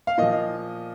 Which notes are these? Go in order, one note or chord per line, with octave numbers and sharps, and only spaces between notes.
F5
A#2 F3 D#5